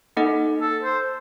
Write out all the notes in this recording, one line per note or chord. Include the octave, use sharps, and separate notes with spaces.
A#3 D#4 A4 D#5 F#5
A4
C5